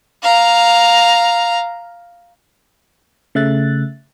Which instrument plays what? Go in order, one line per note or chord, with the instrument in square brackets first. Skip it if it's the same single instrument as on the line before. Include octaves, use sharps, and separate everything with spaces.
[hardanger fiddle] F5 A#5
[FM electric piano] C#3 A3 E5 F#6 A6